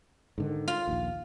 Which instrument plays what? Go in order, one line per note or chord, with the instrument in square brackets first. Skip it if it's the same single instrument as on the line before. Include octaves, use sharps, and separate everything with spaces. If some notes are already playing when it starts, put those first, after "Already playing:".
[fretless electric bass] G#2 D3 D#3
[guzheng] F4
[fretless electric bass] A#1 D#2